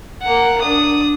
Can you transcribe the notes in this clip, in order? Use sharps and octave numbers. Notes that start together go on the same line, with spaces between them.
A#3 F#5
D4 D#6